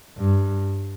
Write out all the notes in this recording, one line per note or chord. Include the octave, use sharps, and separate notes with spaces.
G2